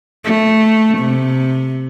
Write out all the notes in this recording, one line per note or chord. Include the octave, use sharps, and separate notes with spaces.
A3
C3